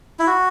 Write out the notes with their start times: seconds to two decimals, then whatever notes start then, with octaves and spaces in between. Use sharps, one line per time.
0.19 E4
0.27 F#4